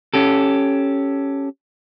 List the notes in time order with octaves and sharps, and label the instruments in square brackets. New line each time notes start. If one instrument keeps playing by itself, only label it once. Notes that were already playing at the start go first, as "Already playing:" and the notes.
[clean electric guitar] C#4 G4 A4